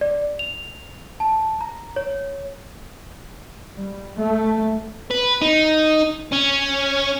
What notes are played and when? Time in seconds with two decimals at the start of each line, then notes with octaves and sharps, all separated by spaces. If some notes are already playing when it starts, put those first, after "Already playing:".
0.01 D5
0.39 F7
1.20 A5
1.61 A#5
1.96 C#5
3.76 G3
4.14 A3
5.11 B4
5.42 D#4
6.32 C#4